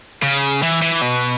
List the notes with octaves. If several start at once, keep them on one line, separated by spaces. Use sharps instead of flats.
C#3
E3
E3
B2